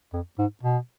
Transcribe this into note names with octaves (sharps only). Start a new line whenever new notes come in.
F2
G#2
B2